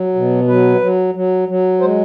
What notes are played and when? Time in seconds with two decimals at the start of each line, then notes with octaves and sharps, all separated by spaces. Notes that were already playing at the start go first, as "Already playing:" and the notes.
Already playing: F#3
0.15 B2
0.48 F#3 B4
0.81 F#3
1.15 F#3
1.48 F#3
1.81 G#3 C5